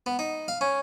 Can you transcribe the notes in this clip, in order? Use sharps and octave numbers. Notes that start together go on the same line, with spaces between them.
B3
D#4
F5
C#4